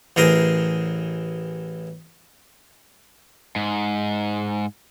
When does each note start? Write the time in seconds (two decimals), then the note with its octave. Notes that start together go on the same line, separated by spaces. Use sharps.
0.16 A1 E3 G#4 A#4 C5
3.56 G#2